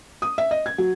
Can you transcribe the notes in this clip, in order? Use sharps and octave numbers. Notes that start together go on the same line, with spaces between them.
D#6
E5
D#5
G#6
F#3